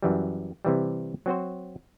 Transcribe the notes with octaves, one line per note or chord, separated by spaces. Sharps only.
F#2 E3 G3
C3 E3 G3
F#3 C4 F#4 C5